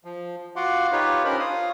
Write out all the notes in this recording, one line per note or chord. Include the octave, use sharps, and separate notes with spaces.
F3
F4 F#4 F5 F#5 C6 D6
D#4 F4 G4 B4 C#5
C#4 D4 G4 A#4 C5 B5
F4 C#5 F5 D#6